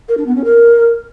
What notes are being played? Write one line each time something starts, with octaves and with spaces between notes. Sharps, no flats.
A#4
D4
B3
C#4
A#4